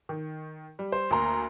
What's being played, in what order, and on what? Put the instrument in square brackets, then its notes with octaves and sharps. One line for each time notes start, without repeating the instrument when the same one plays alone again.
[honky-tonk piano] D#3
G3
[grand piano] C5
[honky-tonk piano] D2 A#5 [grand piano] A#3 C6